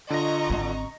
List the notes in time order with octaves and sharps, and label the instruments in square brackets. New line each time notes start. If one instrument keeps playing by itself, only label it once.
[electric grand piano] D3 A#6 [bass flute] F4 [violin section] D#5 A#5 C#6
[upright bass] G#1 C4